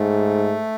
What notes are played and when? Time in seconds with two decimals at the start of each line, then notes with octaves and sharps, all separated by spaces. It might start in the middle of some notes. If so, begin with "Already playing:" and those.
Already playing: G#2 A3